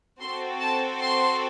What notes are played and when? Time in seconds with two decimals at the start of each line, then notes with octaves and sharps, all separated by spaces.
0.21 C4 F#4 A4 C6
0.60 A5
1.00 C6